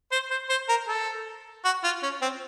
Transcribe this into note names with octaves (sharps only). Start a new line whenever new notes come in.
C5
C5
C5
A#4
A4
F#4
F4
C#4
C4